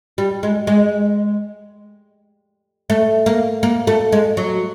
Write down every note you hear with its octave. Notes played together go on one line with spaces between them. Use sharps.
G3
G#3
G#3
A3
A#3
A#3
A3
G#3
F#3